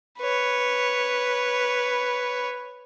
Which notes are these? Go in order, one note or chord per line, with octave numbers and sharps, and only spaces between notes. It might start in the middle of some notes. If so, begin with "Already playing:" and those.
B4 C#5